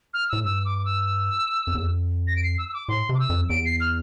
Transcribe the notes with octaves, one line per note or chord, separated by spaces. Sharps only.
F6
A2 E6
G2 E6
D6
D6
E6
F2
E2
F2
A#6
D7
C7
E6
E6
D6
A2 C6
C3
D6
E6
F2
E2 D7
C7
F6